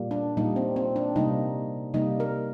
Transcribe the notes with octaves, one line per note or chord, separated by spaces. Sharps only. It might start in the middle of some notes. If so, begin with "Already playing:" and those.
Already playing: A#2 G3 A#3
D4
A#2 G3 A#3 D#4
C4
C4
D4
C3 G3 A#3 D#4
C3 G3 A#3 D#4
A#4